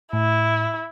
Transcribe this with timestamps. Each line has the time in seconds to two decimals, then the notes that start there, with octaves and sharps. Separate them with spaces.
0.13 A2 E4